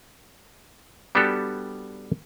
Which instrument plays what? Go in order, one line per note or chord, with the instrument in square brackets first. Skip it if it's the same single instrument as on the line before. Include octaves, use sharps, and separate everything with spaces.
[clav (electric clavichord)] G3 B3 D4 F#4 G4 A4